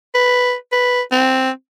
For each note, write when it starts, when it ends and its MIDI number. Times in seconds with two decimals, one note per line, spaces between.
0.15 0.54 71
0.72 1.01 71
1.12 1.50 60